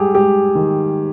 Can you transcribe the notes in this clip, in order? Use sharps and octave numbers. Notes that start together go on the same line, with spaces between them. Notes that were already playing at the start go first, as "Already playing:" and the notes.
Already playing: G#2 G3 G4 G#4
G#2 G4
D#3